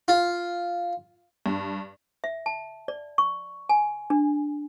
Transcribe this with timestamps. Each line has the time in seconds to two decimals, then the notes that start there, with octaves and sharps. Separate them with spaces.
0.08 F4
1.46 G2
2.24 E5
2.46 A5
2.88 D5
3.18 C#6
3.69 G#5
4.10 D4